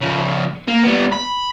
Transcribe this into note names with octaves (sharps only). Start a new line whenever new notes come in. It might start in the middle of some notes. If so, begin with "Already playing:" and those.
C#3 F3
A#3
G3 B3
B5